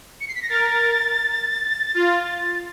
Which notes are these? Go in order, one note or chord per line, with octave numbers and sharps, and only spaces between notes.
C#7
C7
B6
A#6
A#4 A6
F4